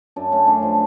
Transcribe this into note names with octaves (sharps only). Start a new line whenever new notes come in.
F#2 D4
A3 C#4
F#2 D4
F3